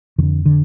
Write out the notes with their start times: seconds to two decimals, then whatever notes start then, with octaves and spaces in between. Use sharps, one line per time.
0.18 F2 D#3
0.22 D3
0.46 D3